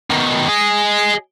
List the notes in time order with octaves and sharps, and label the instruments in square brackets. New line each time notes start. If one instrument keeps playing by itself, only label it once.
[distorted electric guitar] B2 D#3
G#4 D#5